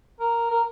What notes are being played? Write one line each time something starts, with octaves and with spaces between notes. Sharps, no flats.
A#4
A#4